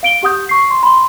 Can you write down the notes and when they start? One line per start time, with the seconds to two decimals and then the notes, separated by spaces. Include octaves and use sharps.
0.03 F5 D7 G7
0.23 G4 F#5 D#6 G6
0.49 C#6 C7
0.70 C6
0.83 B5 C6